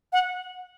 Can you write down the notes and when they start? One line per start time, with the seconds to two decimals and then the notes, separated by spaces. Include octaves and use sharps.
0.13 F#5